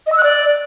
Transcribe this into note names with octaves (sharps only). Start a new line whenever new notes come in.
D#5
E6
F#6
D5